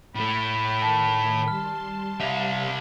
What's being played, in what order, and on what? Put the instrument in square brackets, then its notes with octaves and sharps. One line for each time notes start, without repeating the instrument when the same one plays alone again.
[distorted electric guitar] A2 A3 [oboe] B5
[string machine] D#3 [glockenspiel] A5
[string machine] G3 A5 C6 [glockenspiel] F6
[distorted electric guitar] C2 E5 [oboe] F5 [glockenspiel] F7